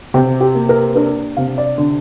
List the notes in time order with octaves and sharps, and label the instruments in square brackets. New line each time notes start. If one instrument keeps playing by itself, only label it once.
[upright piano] C3 G4
G4
A#3
A#4
D4 A#4
C3 F5
D5
D3